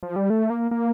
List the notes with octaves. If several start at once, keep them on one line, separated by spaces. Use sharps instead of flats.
F3
G3
A3
A#3
A#3